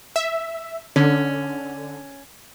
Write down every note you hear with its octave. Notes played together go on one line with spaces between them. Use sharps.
E5
D3 C#4